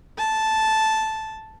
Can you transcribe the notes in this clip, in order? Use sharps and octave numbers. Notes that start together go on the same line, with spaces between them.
A5